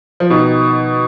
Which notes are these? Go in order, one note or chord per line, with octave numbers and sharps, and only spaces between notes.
F3
B2 D#3